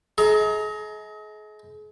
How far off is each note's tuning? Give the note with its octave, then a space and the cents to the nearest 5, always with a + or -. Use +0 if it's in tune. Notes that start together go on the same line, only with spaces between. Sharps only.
G#4 +40 D#5 +40 A#5 +0